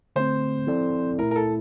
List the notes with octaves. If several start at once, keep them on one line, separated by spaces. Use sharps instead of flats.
D3 A3 C4 C5
F3 C4 E4 A4 D5
A#2 A3 E4 A#4
A#4
A4